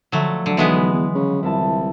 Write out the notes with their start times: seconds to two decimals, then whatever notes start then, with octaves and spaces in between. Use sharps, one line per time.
0.12 D3 F3 F#3 A3
0.46 D3 F#3
0.57 B1 E3 G#3 B3
0.93 E2
1.15 C#3
1.43 C2 E4 F4 A5